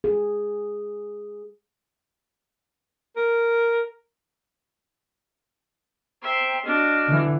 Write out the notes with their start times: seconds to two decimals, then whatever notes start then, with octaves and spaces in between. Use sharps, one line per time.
0.04 G#4
3.16 A#4
6.22 C5 E5 G5 A#5 C6
6.66 D4 F#4 D#5 F6
7.07 D3 E3